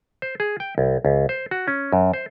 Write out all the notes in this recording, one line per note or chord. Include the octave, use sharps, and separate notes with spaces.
C5
G#4
G5
C2
C#2
C5
F#4
C#4
F#2
C5